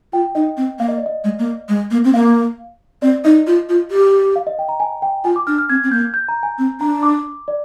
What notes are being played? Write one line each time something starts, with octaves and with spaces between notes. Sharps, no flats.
F4 G5
D#4 D#5
C4
A#3 F5
D#5
D5
D#5
G#3
A#3
G#3
A#3
C4
A#3 F5
C4 D5
D#4 D#5
F4
F4
G4
F5
D#5
G5
A#5
G#5
G5
F4 G#5
D6
D4 F6
F6
C4 G#6
C4
A#3 G6
G6
A#5
G#5
C4
D4 A#5
D6
D5